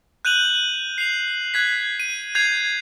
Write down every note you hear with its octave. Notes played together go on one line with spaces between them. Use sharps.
F#6 G6 D#7 F7 F#7
C7 F7
F#6 G#6 B6
D#7
G6 G#6 C7 F7